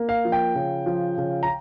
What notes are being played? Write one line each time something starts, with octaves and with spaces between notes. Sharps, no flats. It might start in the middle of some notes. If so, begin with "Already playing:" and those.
Already playing: A#3
F5
F3
G5
C#3
F3
C#3
A#5